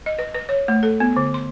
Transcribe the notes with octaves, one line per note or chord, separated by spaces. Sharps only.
D#5
B4
B4
C#5
A3
A4
B3
D3
C6